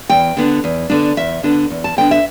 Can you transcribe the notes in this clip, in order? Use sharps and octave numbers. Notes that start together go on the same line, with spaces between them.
E2 G5
D3 B3 D4
E2
D3 B3 D4
E2 E5
D3 B3 D4
E2
A5
D3 B3 D4 G5
E5